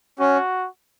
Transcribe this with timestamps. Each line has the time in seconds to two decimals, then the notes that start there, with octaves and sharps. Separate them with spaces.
0.19 C#4 F#4